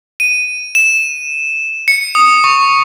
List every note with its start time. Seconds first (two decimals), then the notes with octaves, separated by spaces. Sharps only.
0.20 D#7
0.75 E7
1.88 C#7
2.15 D#6
2.44 C#6